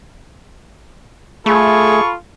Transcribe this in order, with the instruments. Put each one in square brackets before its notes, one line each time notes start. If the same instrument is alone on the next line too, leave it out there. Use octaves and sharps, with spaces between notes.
[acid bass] A3 [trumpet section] F4 A4 C#6 [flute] G#4 [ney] B5